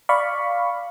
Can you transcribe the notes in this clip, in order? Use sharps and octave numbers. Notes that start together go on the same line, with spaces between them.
D5 F5 B5 C#6